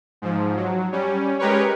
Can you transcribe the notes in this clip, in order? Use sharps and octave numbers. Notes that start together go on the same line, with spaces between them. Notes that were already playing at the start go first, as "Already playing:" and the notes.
G#2 F3
F#3
G3 C#4
G#3 G4 A#4 B4 C#5